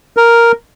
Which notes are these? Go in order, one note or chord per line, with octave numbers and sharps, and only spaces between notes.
A#4